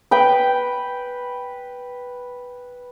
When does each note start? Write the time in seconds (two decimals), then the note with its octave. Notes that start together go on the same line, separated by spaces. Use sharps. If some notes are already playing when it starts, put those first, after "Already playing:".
0.11 B4 G5